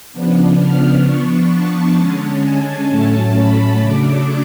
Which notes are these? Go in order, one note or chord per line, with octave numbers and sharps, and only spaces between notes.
C#3 F3 B3 D4
F6
F3 B3 D4 C#6
A5
D3 G#3 C#4
G#5
A2 F#3 A3 C#4 A5
B5
C#3 F#3 A3 D4 D6